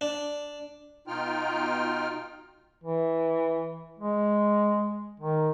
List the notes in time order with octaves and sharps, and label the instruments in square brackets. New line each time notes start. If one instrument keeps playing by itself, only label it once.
[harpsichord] D4
[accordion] B2 D#4 F4 G5 F6
[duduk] E3
G#3
D#3